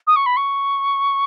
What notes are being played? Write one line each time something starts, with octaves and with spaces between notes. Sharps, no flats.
D#6
C#6
B5
C#6